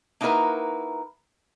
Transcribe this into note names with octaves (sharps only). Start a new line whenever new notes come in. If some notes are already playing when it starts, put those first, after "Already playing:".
A#3 D#4 E4 F#4 A#4 B4